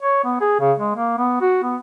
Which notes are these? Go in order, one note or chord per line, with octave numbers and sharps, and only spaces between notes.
C#5
B3
G#4
C#3
G#3
A#3
B3
F#4
B3